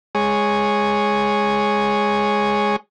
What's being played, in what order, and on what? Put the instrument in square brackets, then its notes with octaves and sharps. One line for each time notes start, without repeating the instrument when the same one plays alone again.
[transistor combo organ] G#3 G#4 C#5